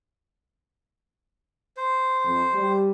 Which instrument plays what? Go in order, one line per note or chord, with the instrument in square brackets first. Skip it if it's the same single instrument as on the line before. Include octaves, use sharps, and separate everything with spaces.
[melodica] C5
[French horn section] F2
G3 G4